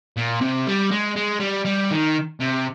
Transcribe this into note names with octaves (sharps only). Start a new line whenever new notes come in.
A#2
C3
G3
G#3
G#3
G3
G3
D#3
C3